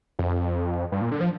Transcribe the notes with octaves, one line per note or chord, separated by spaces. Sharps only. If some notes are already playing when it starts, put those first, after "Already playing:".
F2
G2
A#2
D3
F3